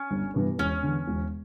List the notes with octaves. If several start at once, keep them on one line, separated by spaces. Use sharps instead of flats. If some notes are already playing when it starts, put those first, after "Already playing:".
Already playing: C#4
G1
G2 E3 B3
E1 C#4
E2 D3
E1